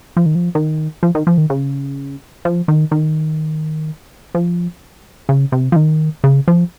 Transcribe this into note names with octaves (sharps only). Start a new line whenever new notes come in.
F3
D#3
F3
D#3
F3
D#3
F3
D#3
C#3
F3
D#3
D#3
F3
C#3
C3
F3
D#3
C#3
F3